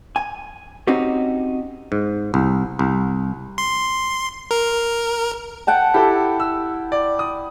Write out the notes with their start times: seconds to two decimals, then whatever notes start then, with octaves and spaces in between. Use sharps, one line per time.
0.16 G#5
0.87 C4 C#4 D#4 F#4 G4
1.92 G#2
2.34 C2
2.79 C2
3.58 C6
4.51 A#4
5.67 F#5 G5 A5
5.94 E4 G4 A4
6.40 E6
6.92 D5
7.19 D#6